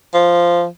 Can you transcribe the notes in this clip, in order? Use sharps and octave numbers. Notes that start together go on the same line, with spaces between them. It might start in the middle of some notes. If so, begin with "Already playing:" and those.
F3